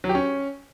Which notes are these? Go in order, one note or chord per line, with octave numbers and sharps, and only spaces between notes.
F#3
G4
C#4